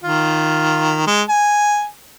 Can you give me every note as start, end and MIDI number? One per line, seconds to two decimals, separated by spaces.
0.04 1.02 51
0.04 1.02 65
1.07 1.23 56
1.29 1.86 80